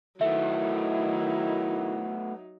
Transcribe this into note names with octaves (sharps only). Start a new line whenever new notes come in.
D#3 F#3 A3 B3 D#4 E4 E5